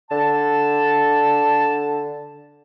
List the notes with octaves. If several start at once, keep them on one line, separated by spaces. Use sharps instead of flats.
D3 A5